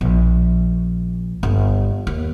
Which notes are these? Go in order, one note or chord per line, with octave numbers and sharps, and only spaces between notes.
A#1
G1
D#2